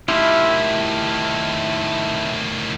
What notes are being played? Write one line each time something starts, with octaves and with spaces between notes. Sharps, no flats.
A2 D#3 E4 F4 G4